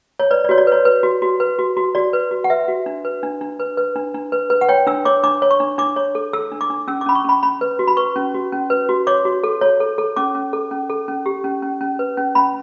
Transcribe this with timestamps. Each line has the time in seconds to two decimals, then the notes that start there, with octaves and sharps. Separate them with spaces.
0.19 C#5
0.31 B4 D5
0.44 D5
0.49 F#4 C#5
0.58 D5
0.67 B4 C#5
0.85 B4
1.03 F#4
1.22 F#4
1.40 B4
1.59 F#4
1.77 F#4
1.95 F#4 D5
2.13 B4
2.31 F#4
2.44 F#5
2.50 B4 E5
2.68 F#4
2.86 D4
3.05 B4
3.23 D4
3.41 D4
3.60 B4
3.77 B4
3.96 D4
4.14 D4
4.32 B4
4.50 B4
4.61 F#5
4.69 C#5 G5
4.87 D4 E6
5.05 C#5 D6
5.23 D4 D6
5.42 C#5
5.51 C#6
5.60 D4
5.78 D4 D6
5.96 C#5
6.15 A4
6.33 A4 E6
6.52 D4
6.61 D6
6.70 D4
6.88 C#4 E6
7.01 D6
7.06 C#4 B5
7.15 C#6
7.24 C#4 B5
7.43 C#4 B5
7.61 B4
7.79 F#4
7.88 B5
7.97 B4 C#6
8.16 C#4
8.34 F#4
8.52 C#4
8.70 B4
8.89 F#4
9.07 C#5 D6
9.25 F#4
9.44 A4
9.61 C#5
9.80 A4
9.98 A4
10.16 C#4 D6
10.35 C#4
10.53 A4
10.71 C#4
10.90 A4
11.08 C#4
11.26 G4
11.44 C#4
11.62 C#4
11.81 C#4
11.99 B4
12.17 C#4
12.35 C#4 B5